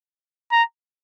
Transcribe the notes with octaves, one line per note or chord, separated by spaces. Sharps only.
A#5